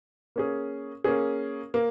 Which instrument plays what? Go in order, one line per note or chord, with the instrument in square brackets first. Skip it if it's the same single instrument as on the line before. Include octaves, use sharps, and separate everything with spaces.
[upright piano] A#3 C#4 G#4
A#3 C#4 G#4
A#3